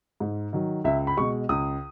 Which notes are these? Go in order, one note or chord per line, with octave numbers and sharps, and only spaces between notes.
G#2
D#3 F#3
C#2 E5
B5
B2 G#3 C#6
C#2 D#6